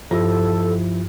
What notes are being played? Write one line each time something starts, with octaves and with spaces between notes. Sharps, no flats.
G2 F3 E4 A4